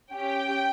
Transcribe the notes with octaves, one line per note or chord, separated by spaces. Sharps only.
C#4 G4 G5